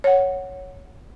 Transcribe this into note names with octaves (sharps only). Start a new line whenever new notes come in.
C#5 F#5